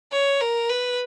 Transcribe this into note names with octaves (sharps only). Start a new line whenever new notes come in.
C#5
A#4
B4